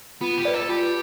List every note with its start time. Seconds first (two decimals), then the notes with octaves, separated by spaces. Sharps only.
0.21 B3 F4
0.37 G4
0.45 B4 D5
0.54 A4
0.69 F4 G4